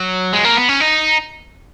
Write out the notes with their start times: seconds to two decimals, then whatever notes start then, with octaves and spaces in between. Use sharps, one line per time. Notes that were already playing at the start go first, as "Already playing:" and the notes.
Already playing: F#3
0.33 G#3
0.45 A#3
0.56 B3
0.69 C#4
0.81 D#4